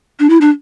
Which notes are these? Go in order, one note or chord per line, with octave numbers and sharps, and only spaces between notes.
D4
E4
D4